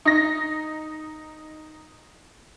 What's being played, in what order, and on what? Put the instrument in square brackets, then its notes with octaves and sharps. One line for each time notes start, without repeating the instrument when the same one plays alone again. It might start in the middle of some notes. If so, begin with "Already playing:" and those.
[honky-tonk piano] D#4 A#6